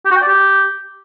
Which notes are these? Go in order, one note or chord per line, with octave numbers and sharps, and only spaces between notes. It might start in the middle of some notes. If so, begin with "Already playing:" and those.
G4
F#4
G5
D5
G4